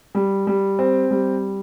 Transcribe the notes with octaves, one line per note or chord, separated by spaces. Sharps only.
G3
G3
C4
G3